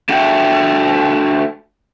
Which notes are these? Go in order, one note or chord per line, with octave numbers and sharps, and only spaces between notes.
A3 D4 F#4 E5 F#5 G5